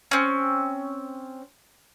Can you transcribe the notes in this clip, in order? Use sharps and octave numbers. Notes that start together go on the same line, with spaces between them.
C4 C#4